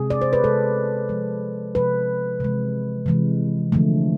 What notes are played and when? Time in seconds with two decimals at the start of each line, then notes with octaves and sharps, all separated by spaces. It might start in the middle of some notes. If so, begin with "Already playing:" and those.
Already playing: C3 G#3 G#4
0.10 D5
0.22 C5
0.33 B4
0.44 C3 G#3 A4
1.09 C3 F3 G#3
1.75 C3 F3 G#3 B4
2.40 C3 E3 G#3
3.06 C3 E3 G#3
3.72 D3 F3 A3